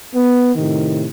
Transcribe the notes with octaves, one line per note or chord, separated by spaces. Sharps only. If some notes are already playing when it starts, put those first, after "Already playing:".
B3
A2 C3 D#3